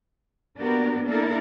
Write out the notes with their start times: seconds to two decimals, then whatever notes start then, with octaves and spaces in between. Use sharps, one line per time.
0.57 A#3 B3 D4 F#4 G4 A#4
1.06 A#3 D4 E4 A4 A#4